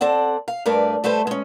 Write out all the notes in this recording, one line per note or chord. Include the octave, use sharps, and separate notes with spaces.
C4 A4 D5 F#5
F5
G2 A3 A#4 B4 D5
G3 A3 A4 B4 C5
G#3 C#4